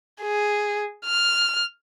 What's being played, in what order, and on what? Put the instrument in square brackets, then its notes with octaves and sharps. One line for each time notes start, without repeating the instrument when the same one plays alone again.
[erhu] G#4
F6